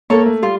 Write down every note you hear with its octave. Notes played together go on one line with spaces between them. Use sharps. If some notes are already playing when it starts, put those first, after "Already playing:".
A#3 A4 C#5
A3
G3 F4